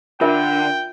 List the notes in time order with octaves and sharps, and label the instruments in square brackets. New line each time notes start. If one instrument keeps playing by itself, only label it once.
[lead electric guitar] D3 [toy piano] F4 A#4 E5 [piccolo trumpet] G5